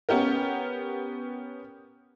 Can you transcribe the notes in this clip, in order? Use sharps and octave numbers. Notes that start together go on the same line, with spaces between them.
B3 C#4 G4 A#4